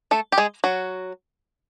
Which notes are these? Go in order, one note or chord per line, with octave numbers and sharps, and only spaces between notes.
A3 A4
G4
G#3 G#4
F#3 F#4